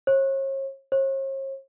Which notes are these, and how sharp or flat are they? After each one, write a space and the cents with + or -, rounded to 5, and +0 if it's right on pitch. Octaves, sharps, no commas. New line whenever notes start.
C#5 -40
C#5 -45